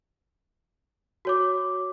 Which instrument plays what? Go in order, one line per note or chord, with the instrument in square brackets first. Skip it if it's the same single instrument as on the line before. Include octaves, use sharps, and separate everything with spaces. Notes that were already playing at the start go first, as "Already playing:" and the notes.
[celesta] F#4 C#5 D6